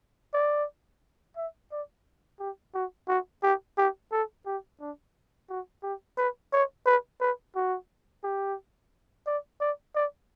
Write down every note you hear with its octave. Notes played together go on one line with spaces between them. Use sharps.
D5
E5
D5
G4
F#4
F#4
G4
G4
A4
G4
D4
F#4
G4
B4
C#5
B4
B4
F#4
G4
D5
D5
D5